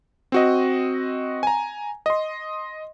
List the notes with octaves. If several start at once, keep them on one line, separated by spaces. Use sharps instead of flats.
C4 F#4 D#5
G#5 A#5
D#5 C6